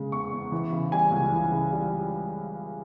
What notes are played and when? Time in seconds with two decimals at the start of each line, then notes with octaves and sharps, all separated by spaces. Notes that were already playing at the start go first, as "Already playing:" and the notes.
Already playing: C#3 G#3
0.12 E2 C#6
0.32 E2
0.52 E3
0.72 C#3
0.92 G3 G#5
1.12 C#2
1.32 E3
1.52 C#3
1.72 G3